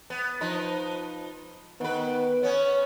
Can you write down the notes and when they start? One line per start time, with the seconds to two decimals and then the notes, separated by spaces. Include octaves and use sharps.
0.10 B3
0.41 F3 D#4 B4
1.81 D#3 B3 B4
2.43 B3 C#4 C#5